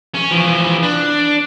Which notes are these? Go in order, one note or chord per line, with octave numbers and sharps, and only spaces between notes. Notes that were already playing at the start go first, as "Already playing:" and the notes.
C#4
E3 F3
D4